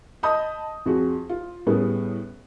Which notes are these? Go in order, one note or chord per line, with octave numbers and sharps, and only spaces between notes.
D#5 A5 B5 D#6 G6
F2 F#4 G#4
F4
A2 G3 B3 C#4 G#4